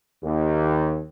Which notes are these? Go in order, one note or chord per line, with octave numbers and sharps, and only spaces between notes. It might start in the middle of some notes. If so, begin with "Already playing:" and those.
D#2